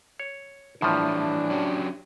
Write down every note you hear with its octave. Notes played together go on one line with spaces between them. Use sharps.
C#5
A2 E3 F3 G3 D4
F#3 C#4 G4